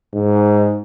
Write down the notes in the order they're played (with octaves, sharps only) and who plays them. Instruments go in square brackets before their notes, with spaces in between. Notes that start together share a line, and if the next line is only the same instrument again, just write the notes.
[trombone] G#2